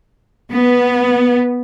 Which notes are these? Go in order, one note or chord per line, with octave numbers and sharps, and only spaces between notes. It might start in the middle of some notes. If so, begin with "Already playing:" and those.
B3